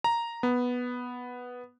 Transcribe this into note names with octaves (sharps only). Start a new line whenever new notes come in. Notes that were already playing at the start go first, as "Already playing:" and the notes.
A#5
B3